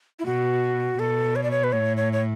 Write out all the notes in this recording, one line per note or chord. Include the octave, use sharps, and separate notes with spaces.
E4
B2 F#4
B2 A4
C#5
D5
C#5
B4
A2 C#5
C#5
C#5